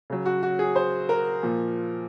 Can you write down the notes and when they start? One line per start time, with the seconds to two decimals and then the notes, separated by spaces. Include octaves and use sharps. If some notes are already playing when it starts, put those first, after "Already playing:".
0.10 C#3 F#3
0.26 F#4
0.43 F#4
0.59 G#4
0.76 C5
1.09 A#4
1.43 A#2 F3